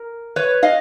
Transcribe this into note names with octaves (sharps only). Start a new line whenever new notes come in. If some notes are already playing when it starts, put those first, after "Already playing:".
Already playing: A#4
B4 C#5
D#5 F5